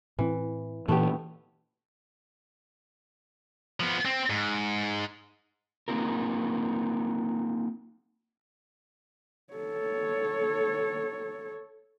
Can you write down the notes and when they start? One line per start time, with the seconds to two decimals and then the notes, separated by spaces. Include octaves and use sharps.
0.19 A2 E3 C4
0.88 A#2 E3 A3 B3 G4
3.80 F3 B3
4.05 C4
4.30 G#2
5.88 A#3 C4 D#4 F4 A#4
9.54 A4 C#5